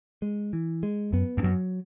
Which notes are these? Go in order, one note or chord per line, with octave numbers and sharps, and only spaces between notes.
G#3
E3
G#3
F#2 B3
E2
F#2 F#3